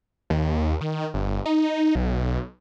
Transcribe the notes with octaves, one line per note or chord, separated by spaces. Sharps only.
D#2
D#3
G1
D#4
B1